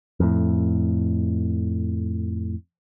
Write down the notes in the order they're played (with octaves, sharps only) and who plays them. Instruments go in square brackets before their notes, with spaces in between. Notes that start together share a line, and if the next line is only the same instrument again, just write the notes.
[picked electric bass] F2 A2